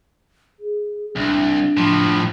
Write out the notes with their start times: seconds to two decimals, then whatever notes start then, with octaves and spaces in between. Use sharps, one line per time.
0.60 G#4
1.16 C2 D4
1.77 A2 F3